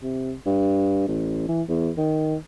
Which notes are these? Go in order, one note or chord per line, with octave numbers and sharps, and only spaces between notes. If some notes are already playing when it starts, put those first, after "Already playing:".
C3
G2
A1
E3
E2
D#3